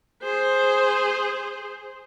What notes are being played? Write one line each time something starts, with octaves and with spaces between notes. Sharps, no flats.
G#4 C5